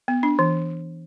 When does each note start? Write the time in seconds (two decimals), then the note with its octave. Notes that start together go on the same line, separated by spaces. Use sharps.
0.08 B3
0.23 D4
0.39 E3